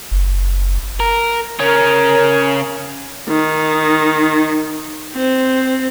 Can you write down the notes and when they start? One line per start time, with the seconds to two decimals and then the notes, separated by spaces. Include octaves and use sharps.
0.11 F#1
1.00 A#4
1.59 C#3 C#4 A#4
3.28 D#3
5.14 C4